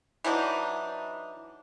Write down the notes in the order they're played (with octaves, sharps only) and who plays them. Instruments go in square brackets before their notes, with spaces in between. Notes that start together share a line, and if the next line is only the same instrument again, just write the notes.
[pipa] E3 F#3 D4 D#4